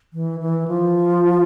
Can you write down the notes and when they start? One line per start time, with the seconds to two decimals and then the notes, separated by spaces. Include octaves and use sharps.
0.13 E3
0.40 E3
0.68 F3